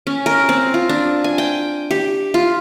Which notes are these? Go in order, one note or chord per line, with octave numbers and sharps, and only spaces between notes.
C#4
A#4
C4
F4
D4
G#5
G5
G4
F4